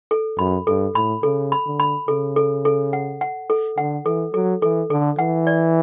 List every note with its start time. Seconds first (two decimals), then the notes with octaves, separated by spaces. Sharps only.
0.11 A4
0.38 F#2 B5
0.67 G2 A4
0.95 A2 B5
1.23 C#3 A4
1.52 B5
1.65 D3
1.80 B5
2.08 C#3 A4
2.36 A4
2.65 A4
2.93 F#5
3.21 F#5
3.50 A4
3.78 D3 F#5
4.06 E3 A4
4.34 F#3 A4
4.62 E3 A4
4.90 D3 A4
5.18 E3 F#5
5.47 D5